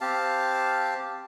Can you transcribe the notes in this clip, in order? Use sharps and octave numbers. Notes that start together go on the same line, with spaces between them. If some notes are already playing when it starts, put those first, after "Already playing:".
C4 G4 F5 A5